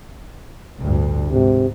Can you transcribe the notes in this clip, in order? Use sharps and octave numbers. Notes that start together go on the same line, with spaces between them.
A1 D2 G2
G#2 C3